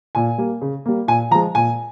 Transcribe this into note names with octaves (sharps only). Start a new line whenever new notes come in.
A#2 G#5
G3 A#3
C#3
G3 A#3
A#2 G#5
F3 G#3 A#5
A#2 G#5